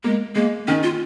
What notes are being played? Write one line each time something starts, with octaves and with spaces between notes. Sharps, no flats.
G#3 A#3
G#3 A#3
D#3 C#4
F4